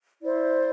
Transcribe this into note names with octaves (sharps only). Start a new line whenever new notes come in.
E4 C5 D5